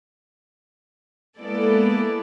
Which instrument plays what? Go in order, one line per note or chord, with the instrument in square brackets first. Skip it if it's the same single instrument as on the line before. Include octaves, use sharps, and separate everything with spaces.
[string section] G#3 A#3 B3 E4 A4 D5